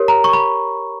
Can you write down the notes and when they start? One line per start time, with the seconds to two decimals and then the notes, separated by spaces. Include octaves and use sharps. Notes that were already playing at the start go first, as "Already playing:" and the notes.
Already playing: G4 A#4 C#5
0.08 A#5
0.24 C#6
0.33 B5